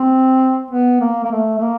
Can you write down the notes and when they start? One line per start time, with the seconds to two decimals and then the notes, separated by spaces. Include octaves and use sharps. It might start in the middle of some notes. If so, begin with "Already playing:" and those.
Already playing: C4
0.71 B3
1.01 A#3
1.24 A#3
1.32 A3
1.58 A3
1.62 A#3